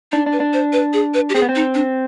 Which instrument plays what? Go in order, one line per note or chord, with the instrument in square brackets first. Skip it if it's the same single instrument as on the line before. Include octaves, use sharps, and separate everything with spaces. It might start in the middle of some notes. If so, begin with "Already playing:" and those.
[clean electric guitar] D4 [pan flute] D#4
[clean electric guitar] D4
[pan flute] B4
[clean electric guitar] D4
[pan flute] C5
B4
G#4
B4
G4
[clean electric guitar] C4 [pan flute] G#4
[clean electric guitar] B3
C4
[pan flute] D#4
D4